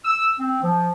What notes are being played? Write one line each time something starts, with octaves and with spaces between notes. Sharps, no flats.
E6
C4
F3